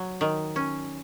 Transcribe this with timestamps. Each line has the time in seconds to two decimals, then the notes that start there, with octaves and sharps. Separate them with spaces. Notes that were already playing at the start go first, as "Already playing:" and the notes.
Already playing: F#3
0.21 D#3
0.56 C#4